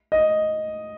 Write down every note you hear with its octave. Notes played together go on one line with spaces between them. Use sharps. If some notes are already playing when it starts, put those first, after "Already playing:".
D#5